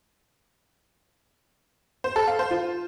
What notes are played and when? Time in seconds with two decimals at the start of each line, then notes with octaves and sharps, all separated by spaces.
2.04 C5
2.16 A4
2.27 F5
2.39 C5
2.51 F4